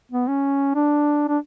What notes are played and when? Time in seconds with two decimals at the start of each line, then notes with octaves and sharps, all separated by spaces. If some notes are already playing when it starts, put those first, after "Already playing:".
0.12 B3
0.28 C#4
0.75 D4
1.28 D4